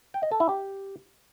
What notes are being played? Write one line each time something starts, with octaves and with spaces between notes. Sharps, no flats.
G5
D#5
A4
E4
G4